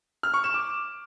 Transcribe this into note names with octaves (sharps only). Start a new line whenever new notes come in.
F6
C#6
E7
D6